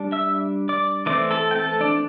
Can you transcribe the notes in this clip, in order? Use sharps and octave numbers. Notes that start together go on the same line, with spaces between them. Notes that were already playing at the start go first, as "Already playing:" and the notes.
Already playing: G3 D4
E5 E6
D5 D6
E3 A3 C4 D5 D6
A4 A5
G5
A4 A5
D4 D5